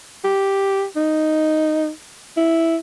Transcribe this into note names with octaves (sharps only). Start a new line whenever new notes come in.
G4
D#4
E4